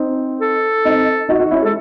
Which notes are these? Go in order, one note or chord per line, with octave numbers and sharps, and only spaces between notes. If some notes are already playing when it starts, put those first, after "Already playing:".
Already playing: C4 D#4
A4
C4 D#4
D#4 F#4
D#4 F#4
C#4 E4
G#3 A4